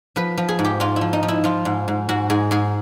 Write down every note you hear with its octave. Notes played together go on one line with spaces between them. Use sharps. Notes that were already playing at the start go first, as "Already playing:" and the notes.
F3 B4
F3
G#4
G#2
G4
G#2 F4
E4
F3
D#4
F3
E4
F3 F4
G#2
G#2
G#2 F#4
G#2 G#4
G#2 G#4